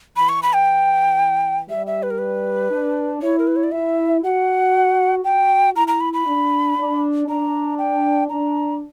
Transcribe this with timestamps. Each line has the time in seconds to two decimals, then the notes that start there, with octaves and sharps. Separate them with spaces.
0.16 E3 B5
0.29 C#6
0.43 B5
0.54 G5
1.69 G3 E5
1.87 E5
2.03 B4
2.10 A#4
2.18 B4
2.71 D4
3.22 E4 C#5
3.39 A#4
3.47 B4
3.56 C#5
3.63 D5
3.72 E4 E5
4.23 F#4 F#5
5.24 F#4 G5
5.75 E4 A#5
5.88 A#5
6.00 B5
6.13 B5
6.26 D4
6.77 D4
7.27 D4 A#5
7.78 G5
8.29 D4 A#5